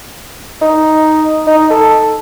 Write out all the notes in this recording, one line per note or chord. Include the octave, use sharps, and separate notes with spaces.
D#4
D#4
A4